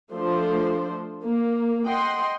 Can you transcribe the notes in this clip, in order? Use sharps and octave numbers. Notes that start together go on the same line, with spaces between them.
F3 A3 D4 C5
A#3
D#5 F#5 G5 C6